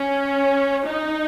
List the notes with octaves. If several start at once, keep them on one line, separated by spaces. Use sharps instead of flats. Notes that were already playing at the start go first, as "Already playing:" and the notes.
Already playing: C#4
D#4